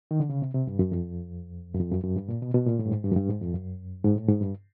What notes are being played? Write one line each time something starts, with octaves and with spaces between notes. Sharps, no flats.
D#3
D3
C#3
C3
C3
G2
F#2
F2
F#2
F2
F#2
F#2
G2
A#2
B2
B2
A#2
A2
G2
G#2
G2
F#2
G2
G#2
F2
F#2
G#2
A2
G#2
G2